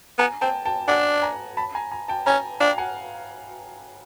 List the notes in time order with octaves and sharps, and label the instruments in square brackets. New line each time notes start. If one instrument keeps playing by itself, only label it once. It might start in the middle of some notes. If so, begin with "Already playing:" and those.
[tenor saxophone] B3 [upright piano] G#5 A#5
[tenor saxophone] C4 [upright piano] G5 A5
[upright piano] G5 A5
[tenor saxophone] D4 [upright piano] F#5 G#5
[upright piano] G#5 A#5
A5 B5
G#5 A#5
G#5 A#5
G5 A5
[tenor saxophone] C#4 [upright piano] G#5 A#5
[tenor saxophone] D4 [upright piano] F5 G5
[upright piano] F#5 G#5